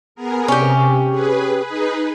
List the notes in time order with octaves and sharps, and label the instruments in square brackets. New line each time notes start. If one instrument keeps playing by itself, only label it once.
[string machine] B3 G#4 A#4
[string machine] C3 [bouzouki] C#4 G4
[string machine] G#4 B4
D#4 G#4 B4